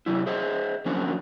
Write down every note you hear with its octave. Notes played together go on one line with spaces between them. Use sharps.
C3 F#3 E4
G#4 C5 D#5 E5
D3 F3 F#3 A#3 C4 C#4